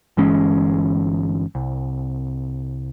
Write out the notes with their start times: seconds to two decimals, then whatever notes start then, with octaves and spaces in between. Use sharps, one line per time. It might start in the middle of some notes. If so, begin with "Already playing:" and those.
0.17 G1 E3 G#3 C#4
1.55 C2